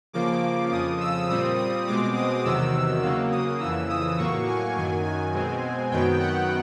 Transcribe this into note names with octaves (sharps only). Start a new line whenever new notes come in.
C#3 F3 A#3 D6
F2 C#3 F3 D#6
E6
A#2 G3 C4 D#6
D#6
B2 G#3 C4 D6
D#6
E2 C3 D#3 F#3 E6
C#3 F#3 A#3
D#6
F2 C#3 E3 E6
D#6
A2 F#3 A#3 C#6
G#5
F#2 D#3 F#3 G#5
G#5
B2 G#3 C4
F#2 D#3 F#3 B3 G5
F#5